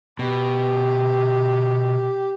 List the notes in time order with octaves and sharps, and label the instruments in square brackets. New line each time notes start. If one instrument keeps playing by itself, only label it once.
[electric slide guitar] B2 [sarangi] G4